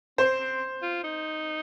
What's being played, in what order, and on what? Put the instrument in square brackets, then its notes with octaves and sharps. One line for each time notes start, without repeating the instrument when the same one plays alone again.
[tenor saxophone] C4 [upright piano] C5
[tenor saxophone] C4
F4
D#4